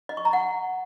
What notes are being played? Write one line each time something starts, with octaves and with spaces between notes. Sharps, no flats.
D#5
C#6
A#5
F#5